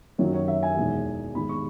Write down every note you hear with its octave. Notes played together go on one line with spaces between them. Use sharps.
F#2 D#3 F#3 C#5
C#5
E5
G#5
E2 B2 G#3 D#4
G#2 D#3 G#3 B3 B5
C#6